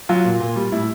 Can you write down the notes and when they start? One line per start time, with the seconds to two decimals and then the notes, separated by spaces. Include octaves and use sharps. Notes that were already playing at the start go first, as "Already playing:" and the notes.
0.09 F#3 F4
0.25 A#2
0.40 A#2
0.56 G3
0.72 A2 E4